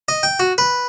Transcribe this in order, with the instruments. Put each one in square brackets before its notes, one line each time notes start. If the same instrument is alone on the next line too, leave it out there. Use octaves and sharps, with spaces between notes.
[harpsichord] D#5
G5
F#4
B4